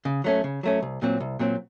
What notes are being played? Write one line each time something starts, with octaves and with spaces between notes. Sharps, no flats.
C#3
F#3 A3 C#4
C#3
F#3 A3 C#4
C2
A#2 F#3 C4
C2
A#2 F#3 C4